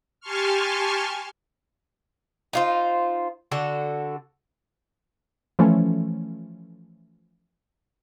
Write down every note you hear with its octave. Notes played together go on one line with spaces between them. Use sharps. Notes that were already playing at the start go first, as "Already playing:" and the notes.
G4 G#5 A5 C6 C#6 F6
D#4 F4 C5
D3 F#4 A4
E3 F3 A3 C#4